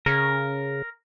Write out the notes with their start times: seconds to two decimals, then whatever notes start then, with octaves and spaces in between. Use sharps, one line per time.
0.06 C#3 A#4